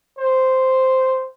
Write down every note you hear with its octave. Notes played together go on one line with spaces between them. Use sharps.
C5